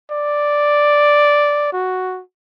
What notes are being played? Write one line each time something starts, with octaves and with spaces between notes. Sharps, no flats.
D5
F#4